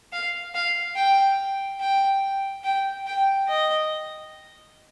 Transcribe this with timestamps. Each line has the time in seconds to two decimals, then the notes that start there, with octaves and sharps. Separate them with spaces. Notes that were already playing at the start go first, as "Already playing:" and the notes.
0.13 F5
0.55 F5
0.96 G5
1.80 G5
2.64 G5
3.07 G5
3.48 D#5